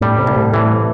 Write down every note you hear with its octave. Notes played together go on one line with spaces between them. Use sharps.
A2 G3
C3
C2
A2
A2 E3